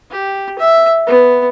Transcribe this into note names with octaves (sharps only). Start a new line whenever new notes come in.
G4
E5
B3